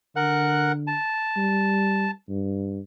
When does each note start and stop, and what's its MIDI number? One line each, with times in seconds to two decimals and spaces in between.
0.16 0.95 50
0.16 0.72 70
0.16 0.72 78
0.16 0.72 90
0.87 2.11 81
1.37 2.09 55
2.29 2.80 43